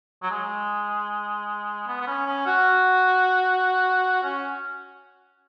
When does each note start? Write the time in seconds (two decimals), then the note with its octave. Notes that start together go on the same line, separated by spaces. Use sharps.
0.23 F#3
0.30 G#3
1.87 B3
2.01 B3
2.07 C#4
2.26 C#4
2.46 F#4
4.23 C#4